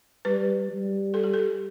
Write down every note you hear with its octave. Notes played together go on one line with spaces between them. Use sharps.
G3 B4
G3
A4
G4
A4